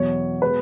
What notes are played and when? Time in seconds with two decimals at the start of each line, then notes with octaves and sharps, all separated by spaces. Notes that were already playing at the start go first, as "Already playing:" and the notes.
Already playing: E2 B2 F#3 C#5
0.42 B2 G#3 B4